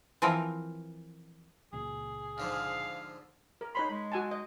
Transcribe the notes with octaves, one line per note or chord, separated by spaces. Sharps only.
E3 F3 C4 A#4
C#2 A#2 G#4
G#2 D3 F3 F5
A#4
D#4 C#5 B5 C6
G#3
F#4 G#5 A5
D#5